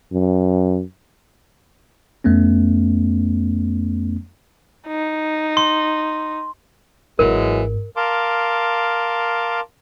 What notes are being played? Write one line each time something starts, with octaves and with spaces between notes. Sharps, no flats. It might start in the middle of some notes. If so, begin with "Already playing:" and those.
F#2
F2 A3 B3 C#4
D#4
C6
G#1 G#2 E3 F#3 G#3 A#4
A#4 F5 A5 C6 D6